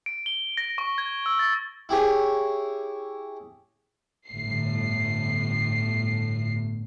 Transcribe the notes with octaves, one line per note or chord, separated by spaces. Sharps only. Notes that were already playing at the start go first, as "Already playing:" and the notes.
D7
G7
A#6
C#6
G#6
E6
A6
E4 G4 G#4 C#5
G1 A2 C7